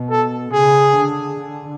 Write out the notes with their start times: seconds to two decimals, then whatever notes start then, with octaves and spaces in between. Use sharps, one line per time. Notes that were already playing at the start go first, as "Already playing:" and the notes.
Already playing: B2
0.10 A4
0.52 C#3 G#4
0.96 D3
1.40 D3